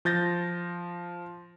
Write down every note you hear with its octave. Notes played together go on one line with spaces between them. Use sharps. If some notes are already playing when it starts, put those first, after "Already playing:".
F3 G6 A6 A#6